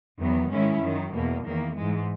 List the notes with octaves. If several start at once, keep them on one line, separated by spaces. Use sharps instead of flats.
E2 D#3 F#3 B3
G#2 D#3 G#3 C#4 E4
F#2 D#3 F#3
E2 B2 A#3
E2 D#3 A#3
G#2 E3 G#3